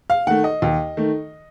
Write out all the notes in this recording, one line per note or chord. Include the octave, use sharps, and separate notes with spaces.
F5
D#3 A3 F#5
D#5
D#2
D#3 A3